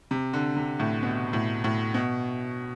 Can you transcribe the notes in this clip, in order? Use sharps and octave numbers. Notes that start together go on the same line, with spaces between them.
C3
D3
C3
A2
B2
A2
A2
B2